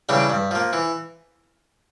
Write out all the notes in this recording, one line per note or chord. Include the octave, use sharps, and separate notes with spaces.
C#3 E3 G3 D4
G2
F3 A#3
E3